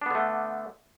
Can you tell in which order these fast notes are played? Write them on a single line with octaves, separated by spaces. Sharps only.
D4 B3 D3 A3